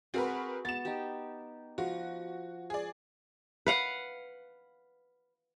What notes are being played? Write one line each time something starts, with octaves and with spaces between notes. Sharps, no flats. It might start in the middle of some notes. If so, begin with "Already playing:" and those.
C4 F#4 G#4 A#4 B4
B3 A6 E7
D#4 G4
F3 F#4
G#4 D5
B4 F5 F#5